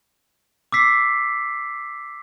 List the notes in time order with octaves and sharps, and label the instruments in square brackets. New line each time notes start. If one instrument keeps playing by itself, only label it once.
[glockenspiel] D6 E6 B6 C7